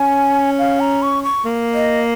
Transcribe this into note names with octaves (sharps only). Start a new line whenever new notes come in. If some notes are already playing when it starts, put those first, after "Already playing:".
Already playing: C#4 G#5
F5
A#5
C#6
C#6
A#3
D#5